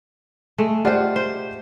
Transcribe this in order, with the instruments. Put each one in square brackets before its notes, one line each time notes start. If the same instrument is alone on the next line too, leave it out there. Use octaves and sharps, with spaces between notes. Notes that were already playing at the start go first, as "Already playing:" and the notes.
[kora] G#3 A3
[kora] F4 C5 [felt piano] G4 D5 F#5
[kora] C5